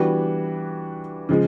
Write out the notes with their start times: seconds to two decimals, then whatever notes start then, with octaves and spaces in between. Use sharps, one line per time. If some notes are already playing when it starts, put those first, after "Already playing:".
Already playing: E3 G3 B3 D4 F#4
1.29 C#3 F3 G#3